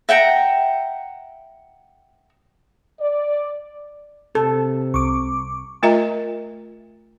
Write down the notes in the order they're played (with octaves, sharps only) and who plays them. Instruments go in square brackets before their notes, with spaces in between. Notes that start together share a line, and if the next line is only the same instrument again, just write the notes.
[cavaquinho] E5 F#5 G5 A#5
[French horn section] D5
[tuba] C3 [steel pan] A4
[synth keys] C2 [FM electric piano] C#6 D6
[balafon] A3 F4 A#4 D#5 E5 A#5